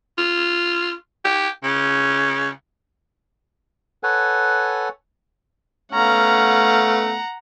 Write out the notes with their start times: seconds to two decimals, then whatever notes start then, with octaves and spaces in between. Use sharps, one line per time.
0.18 F4
1.25 G4
1.64 C#3
4.03 A4 B4 C#5 F#5 G#5
5.92 A3 B3 C#4 F5 F#5 A#5